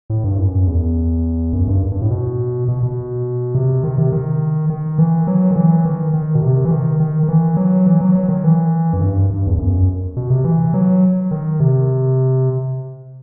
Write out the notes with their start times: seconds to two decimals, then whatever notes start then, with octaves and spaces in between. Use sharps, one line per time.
0.10 A2
0.24 G2
0.38 F#2
0.67 E2
1.53 F#2
1.67 G2
1.92 G2
2.02 A2
2.11 B2
2.68 B2
2.83 B2
3.55 C3
3.84 D#3
3.98 C3
4.12 D#3
4.70 D#3
4.98 E3
5.27 F#3
5.51 D#3
5.56 E3
5.85 D#3
6.13 D#3
6.35 B2
6.42 C3
6.65 E3
6.71 D#3
7.00 D#3
7.23 D#3
7.28 E3
7.57 F#3
7.86 E3
8.01 F#3
8.15 F#3
8.29 D#3
8.44 E3
8.93 F#2
9.01 G2
9.30 G2
9.47 E2
9.58 F#2
10.17 B2
10.30 C3
10.44 E3
10.74 F#3
11.31 D#3
11.60 C3